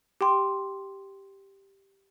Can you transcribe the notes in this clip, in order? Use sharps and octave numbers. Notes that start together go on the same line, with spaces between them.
G4 G5 C6